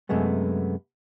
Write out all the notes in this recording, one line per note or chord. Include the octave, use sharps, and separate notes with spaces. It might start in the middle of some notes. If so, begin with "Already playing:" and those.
F#2 C3 G#3 A3 B3